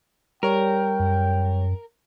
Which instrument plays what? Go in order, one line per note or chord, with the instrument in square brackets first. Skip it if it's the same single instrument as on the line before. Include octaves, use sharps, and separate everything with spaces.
[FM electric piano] G3 C#5 [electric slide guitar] A#4 [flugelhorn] G5
[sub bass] F#2